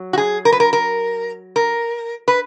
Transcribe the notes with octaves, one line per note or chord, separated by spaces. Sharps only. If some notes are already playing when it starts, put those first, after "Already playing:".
Already playing: F#3
F#4
G#4
A#4
B4
A#4
A#4
A#4
B4